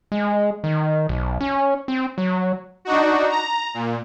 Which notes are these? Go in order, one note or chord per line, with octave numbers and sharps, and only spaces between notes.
G#3
D#3
B1
C#4
C4
F#3
D4 D#4 F#4
A#5
A#2